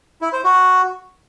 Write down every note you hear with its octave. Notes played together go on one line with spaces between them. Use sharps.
E4
C5
F#4